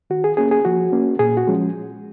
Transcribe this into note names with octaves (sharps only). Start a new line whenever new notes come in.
D#3 F#4
G#4
A#3 C#4 G#4
G#4
F3 F#4
A#3 C#4
A#2 G#4
F#4
F3 G#3 C#4